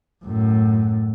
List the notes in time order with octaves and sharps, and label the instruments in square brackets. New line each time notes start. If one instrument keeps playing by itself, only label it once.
[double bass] F#2 A2